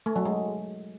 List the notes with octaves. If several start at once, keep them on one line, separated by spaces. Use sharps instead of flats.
A3
F#3
G#3